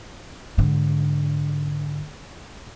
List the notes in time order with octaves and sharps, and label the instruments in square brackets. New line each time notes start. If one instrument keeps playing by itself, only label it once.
[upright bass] G#2 D3